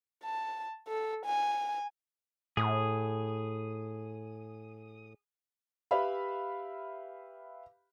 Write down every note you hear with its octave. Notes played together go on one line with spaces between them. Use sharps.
A5
A4
G#5
A2 G#4 D#6
G4 B4 E5 F5 B5